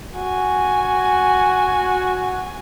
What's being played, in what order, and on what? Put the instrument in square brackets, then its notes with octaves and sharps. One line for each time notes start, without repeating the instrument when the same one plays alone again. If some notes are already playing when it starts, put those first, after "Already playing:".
[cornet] F#4 [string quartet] G#5